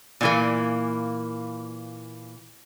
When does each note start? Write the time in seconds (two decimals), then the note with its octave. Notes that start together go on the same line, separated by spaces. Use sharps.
0.21 A#2 E3 A#3